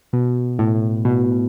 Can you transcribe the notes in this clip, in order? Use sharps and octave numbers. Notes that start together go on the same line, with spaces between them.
B2
A2
B2